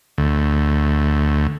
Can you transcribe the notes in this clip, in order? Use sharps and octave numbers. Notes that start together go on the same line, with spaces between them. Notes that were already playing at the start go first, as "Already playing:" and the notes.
D2